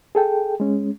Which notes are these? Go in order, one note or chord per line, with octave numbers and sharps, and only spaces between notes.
G#4 A4 G5
G#3 C#4